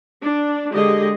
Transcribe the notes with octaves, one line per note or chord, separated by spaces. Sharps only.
D4
D3 G#3 G4 G#4 D#5